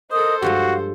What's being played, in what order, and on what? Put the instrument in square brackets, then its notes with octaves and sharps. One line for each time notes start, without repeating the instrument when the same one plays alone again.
[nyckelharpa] A4 C5 [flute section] A#4 D#5 D#6
[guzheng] G2 F3 G#3 [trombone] F#4 [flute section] F5